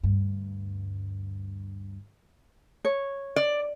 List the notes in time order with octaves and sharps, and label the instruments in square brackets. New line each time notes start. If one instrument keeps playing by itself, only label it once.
[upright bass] D2 G2
[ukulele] C#5
[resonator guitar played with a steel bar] D5